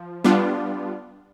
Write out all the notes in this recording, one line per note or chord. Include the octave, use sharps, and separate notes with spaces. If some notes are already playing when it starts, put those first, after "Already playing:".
Already playing: F3
G3 B3 D4 F4